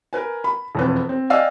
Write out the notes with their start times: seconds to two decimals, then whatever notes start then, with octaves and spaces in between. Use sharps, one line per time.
0.13 A#4 B4 G#5
0.44 B5
0.75 E1 F2 B4
1.09 C4
1.30 D5 D#5 F5 G5 G#5 E6